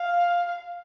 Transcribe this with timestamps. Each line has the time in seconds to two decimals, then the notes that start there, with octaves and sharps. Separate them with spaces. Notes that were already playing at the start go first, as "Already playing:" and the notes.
Already playing: F5